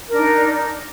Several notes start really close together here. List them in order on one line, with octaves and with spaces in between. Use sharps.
A#4 D4 D#4